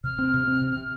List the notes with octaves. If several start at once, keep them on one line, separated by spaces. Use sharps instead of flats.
C3 F6
C4
C3
C4
C3
C3